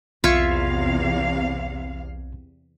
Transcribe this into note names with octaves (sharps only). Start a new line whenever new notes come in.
B1 E2 C3 F4 E5 F5 C#6 G#6